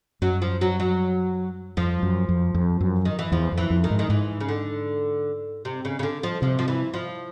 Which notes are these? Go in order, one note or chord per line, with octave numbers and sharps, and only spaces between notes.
F#2 F#3
F3
F#3
F#3
F2 F3
F#2
F2
F2
F#2
D#3
E3
E2 F3
F2
E3
F2
D#3
G#2
D#3
G#2 E3
C#3
D3
C3
C#3
C#3
D3
F3
C3 F3
F3
E3
F3